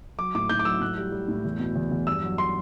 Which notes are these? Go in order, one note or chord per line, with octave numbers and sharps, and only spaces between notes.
F#3 D6
A2 D6
A2 G6
D6
F#3 E6
A2 F#6
G3
G3
A2
E2
B2
E2
E2
G2 E6
F#3
C6